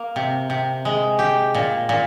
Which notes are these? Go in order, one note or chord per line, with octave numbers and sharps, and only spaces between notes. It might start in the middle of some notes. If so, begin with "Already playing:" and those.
Already playing: A#3
C3
C3
G#3
G4
A#2
A#2